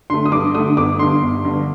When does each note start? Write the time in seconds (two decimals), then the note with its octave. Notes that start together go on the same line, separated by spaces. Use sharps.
0.10 D3 A3 C6
0.25 D#6
0.32 G2 D6
0.55 D3 A3 D#6
0.77 G1 D6
0.99 G2 D3 C6
1.22 G1
1.45 G2 D3